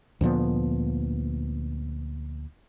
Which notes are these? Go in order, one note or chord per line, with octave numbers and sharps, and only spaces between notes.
D2 A#2 F3 B3